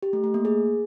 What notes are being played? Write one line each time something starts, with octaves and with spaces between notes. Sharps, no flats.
G4
A3
A3
A#3
G#4